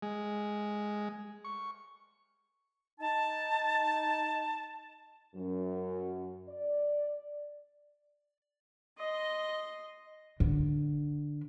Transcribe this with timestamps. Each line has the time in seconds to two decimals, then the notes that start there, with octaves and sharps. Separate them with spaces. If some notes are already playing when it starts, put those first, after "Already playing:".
0.02 G#3
1.44 C#6
3.00 D#4 A5
5.35 F#2
6.48 D5
8.98 D#5 C6
10.40 D3